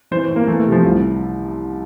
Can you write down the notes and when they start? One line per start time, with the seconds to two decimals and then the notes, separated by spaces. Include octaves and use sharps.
0.11 E3 C5
0.30 A2
0.36 A#3
0.48 E3 A3
0.59 A3
0.66 C3
0.72 F3
0.85 C2